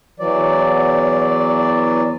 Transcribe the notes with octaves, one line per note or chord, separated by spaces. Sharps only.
E2 E3 F#3 D5